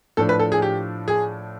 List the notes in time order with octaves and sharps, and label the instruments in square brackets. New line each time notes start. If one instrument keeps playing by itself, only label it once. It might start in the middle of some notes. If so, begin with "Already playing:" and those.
[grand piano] A2 F3 A3 D4 [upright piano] A4
[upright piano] B4
A4
G#4
G4
G#4